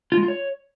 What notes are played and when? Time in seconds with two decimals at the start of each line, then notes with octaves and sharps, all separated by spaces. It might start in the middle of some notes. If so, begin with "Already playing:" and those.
0.12 F4
0.17 G#3
0.23 F4
0.28 C#5